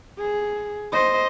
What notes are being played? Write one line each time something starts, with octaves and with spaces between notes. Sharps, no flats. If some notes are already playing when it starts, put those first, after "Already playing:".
G#4
C5 D#5